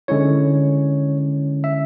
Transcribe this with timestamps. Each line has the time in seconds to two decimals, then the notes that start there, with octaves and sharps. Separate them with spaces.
0.08 D3 G#3 C#4 E4 C#5
1.64 E5